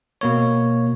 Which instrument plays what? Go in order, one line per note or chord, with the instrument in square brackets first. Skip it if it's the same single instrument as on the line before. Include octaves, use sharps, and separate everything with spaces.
[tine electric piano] B2 A#3 C#5